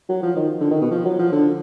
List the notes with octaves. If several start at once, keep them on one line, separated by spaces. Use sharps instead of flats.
F#3
F3
D#3
D3
D#3
B2
F3
F#3
F3
D3